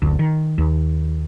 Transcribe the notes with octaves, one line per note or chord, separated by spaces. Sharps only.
F#1 D2
D#3
D#2